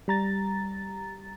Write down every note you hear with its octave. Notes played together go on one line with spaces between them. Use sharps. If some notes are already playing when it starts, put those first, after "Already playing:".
G3 A#5 A6